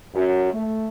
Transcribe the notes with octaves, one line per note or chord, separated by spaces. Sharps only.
F#2
A3